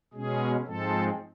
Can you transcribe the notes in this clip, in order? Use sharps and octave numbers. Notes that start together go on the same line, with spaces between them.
B2 G#3 C#4 G#4
G#2 F3 G#3 C4 A4